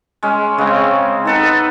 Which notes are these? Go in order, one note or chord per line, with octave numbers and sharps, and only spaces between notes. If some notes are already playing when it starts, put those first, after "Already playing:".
G#3 C#4
C#3 G#3 C4
B3 D#4 A4 B4